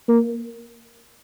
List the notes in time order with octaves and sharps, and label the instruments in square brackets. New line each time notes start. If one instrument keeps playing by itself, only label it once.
[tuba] A#3